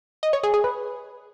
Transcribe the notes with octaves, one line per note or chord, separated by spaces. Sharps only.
D#5
C#5
G#4
G#4
B4